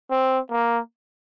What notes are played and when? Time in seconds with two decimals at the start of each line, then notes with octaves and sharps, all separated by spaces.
0.10 C4
0.51 A#3